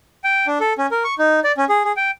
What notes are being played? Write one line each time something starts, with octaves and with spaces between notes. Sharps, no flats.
G5
D4
A4
C#4
A#4
C#6
D#4
D5
C#4
G#4
G#4
G5